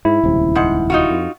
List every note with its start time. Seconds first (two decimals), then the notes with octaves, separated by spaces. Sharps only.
0.05 G#2 E4
0.23 D#1 C#2 C3
0.55 G#2 F#5
0.90 D#4 F4 F#4
1.10 F2